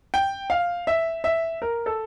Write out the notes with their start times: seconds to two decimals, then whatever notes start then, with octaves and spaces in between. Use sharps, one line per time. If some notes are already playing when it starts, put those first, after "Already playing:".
0.14 G5
0.50 F5
0.87 E5
1.24 E5
1.62 A#4
1.86 A4